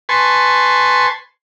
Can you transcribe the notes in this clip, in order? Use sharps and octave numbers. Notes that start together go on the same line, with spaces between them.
B4 G#5 A5 C6 C#6